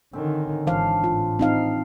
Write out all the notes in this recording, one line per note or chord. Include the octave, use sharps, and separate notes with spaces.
D3 D#3 C4 C#4
G#1 E3 D4 C5 F5
A2 F4
C4 D#4 F5